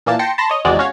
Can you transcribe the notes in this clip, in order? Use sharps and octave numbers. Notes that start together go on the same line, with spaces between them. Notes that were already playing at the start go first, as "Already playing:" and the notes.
A#2 E3 A#3 A5
G5 A5 C6 A#6 C#7
A5 B5 C6 A#6
C#5 D#5
G#1 E2 C3 G#3 F#4 D5
C#4 F#4 C#5 F5